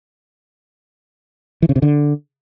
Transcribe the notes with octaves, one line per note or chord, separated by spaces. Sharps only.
E3
C#3
C3
D3